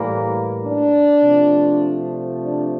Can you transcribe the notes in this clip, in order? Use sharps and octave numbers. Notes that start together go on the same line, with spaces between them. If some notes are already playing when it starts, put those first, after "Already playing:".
Already playing: A2 E3 G3 A#3
D4
C3 F3 A3
D4